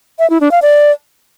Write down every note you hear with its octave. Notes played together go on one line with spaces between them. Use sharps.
E5
E4
D4
F5
D5